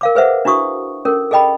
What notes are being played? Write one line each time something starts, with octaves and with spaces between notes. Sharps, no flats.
A#4 F5 D6
G#4 B4 C5 E5 F#5
D4 E4 F#4 C#6 D#6
C#4 A4 A#4
G#4 A4 D#5 G5 B5